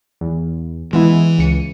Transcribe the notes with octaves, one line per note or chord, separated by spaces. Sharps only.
E2
E3 G#3 B3 E4
C#2 C#7 D#7